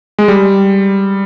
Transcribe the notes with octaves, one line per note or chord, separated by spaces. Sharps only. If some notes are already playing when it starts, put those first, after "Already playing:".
G#3
G3